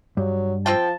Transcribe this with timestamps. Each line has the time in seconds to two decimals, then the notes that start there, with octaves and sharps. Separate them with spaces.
0.17 G2 F#3
0.66 F3 C4 F4 G5 A5